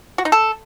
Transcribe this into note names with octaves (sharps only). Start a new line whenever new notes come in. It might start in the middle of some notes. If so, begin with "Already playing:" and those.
F#4
D#4
A4